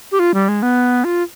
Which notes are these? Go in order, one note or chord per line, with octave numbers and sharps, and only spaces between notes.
G4
F4
G3
G#3
B3
F4